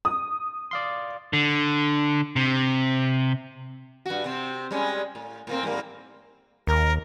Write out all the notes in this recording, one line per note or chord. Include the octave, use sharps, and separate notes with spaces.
D#6
D5 F5 C6
D3
C3
G2 F#4
C3 C4
G3 G#3 C#4
A2
A2 A#3 C4
G#2 G3 A#3
D#2 A#4